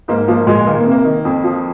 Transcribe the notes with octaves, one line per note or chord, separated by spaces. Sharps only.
G#2 A#3
F3 A#3
A#2 G#3
D#3 A#3
A#3
C3
A#3
D#3
F2
F3